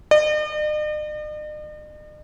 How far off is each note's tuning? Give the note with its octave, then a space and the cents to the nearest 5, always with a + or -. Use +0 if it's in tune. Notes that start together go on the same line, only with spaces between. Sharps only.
D#5 -45